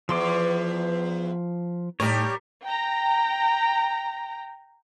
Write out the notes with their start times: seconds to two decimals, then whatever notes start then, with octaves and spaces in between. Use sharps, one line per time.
0.09 E2 F3 C6 D6
2.00 A2 G3 D#4 G4 A#4 C#5
2.65 G5 A#5